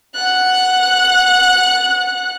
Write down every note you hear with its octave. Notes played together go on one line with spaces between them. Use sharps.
F#5 F#6